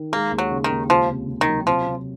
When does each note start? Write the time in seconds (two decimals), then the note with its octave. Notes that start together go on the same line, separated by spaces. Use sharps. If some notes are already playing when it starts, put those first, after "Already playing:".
Already playing: D#3
0.12 G#3 A#3
0.32 D#2
0.38 F#3
0.51 C#3
0.64 D#3
0.71 D#2
0.90 C#2 F3
1.09 C3
1.28 C3
1.41 D#3
1.47 F#3
1.67 C3 F3
1.87 C3